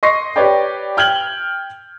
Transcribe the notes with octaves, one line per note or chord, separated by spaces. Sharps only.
D#5 C6 C#6 A#6 C7
G4 B4 C#5 D5 G5
G5 F6 G6 G#6 F#7 G7